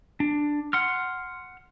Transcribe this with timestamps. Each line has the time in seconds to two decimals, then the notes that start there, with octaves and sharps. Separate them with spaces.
0.20 D4
0.73 F#5 C6 F6